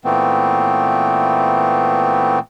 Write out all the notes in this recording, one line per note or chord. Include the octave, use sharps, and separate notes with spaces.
A#2 E3 A3 B3 C4